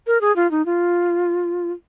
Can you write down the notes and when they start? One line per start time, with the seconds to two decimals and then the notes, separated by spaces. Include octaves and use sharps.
0.07 A#4
0.21 G#4
0.36 F4
0.51 D#4
0.66 F4